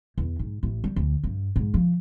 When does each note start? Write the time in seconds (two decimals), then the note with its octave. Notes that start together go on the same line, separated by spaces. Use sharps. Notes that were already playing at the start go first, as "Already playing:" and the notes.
0.18 E2
0.39 G#2
0.63 A1
0.84 G3
0.96 D2
1.24 G2
1.56 G#2
1.74 F3